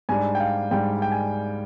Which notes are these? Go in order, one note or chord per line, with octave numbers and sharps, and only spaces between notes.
G#2 G3 D4 G#5
G5
F5
G#2 G3 D4 G5
G5
G#5